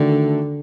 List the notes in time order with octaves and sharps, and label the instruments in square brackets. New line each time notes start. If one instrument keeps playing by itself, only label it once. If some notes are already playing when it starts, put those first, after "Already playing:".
Already playing: [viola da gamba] D3 [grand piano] D#3 A3 D4 F#4